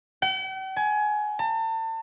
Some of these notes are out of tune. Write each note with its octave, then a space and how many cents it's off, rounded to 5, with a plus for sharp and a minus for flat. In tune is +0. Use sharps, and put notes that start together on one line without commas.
G5 -45
G#5 +25
A5 +40